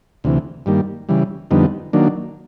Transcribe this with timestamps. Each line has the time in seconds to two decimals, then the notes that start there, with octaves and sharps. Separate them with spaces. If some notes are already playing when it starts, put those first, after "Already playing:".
0.24 D2 C3 E3
0.66 G2 D#3 G3 A#3
1.09 C#3 E3 G3
1.51 F2 D3 G3 B3 D#4
1.93 D#3 F#3 A#3 D4